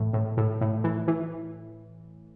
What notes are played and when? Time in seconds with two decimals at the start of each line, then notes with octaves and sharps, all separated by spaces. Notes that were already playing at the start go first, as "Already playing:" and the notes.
Already playing: A2 E3
0.13 A2
0.37 A2
0.61 A2
0.84 E3
1.08 E3